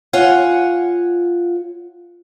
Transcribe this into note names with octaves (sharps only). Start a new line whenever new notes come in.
F4 C#5 F#5 G#5